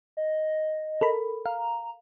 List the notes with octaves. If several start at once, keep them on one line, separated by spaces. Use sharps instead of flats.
D#5
A4 A#4 B5
F5 A#5